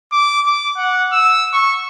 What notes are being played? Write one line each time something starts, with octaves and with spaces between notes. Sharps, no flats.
D6
D6
F#5
E6
C#6